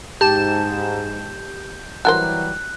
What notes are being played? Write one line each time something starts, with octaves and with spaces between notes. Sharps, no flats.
G#2 G4 A5 G6 E7
E3 F#3 G3 F#4 A#4 C5 F#6